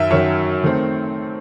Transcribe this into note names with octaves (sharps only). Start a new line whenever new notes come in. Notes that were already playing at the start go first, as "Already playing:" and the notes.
Already playing: F#2 D#3 F#3 E5
F#2 D#3 F#3 C#5
D#3 A3 C4